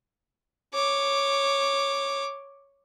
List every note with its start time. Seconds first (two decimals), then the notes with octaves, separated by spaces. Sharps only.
0.74 C#5 D6